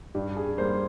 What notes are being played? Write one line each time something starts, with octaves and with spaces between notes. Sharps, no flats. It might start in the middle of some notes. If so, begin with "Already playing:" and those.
G2 G4
G#4
G3 A#3 C5